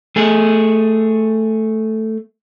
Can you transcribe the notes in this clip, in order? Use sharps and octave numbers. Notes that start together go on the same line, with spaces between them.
A3 G#4